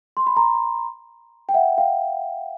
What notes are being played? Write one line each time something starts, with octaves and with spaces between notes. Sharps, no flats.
C6
B5
A#5 C6
G5
E5 F#5
F5 G5